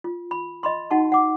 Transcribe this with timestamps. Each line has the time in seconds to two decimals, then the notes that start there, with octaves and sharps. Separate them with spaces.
0.04 F4
0.31 B5
0.63 D#5 B5 C6
0.90 D#4 F#4 F#5 A5 C#6
1.12 F#5 D6